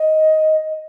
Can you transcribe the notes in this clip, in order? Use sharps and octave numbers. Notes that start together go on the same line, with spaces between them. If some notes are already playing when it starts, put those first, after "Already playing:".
Already playing: D#5